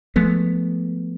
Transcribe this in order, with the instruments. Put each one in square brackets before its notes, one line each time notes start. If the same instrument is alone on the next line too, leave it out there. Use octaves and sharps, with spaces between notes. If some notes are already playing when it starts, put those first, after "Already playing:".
[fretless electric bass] F3 G#3 A3 B3